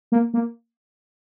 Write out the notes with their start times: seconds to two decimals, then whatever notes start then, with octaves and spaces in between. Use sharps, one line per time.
0.12 A#3
0.34 A#3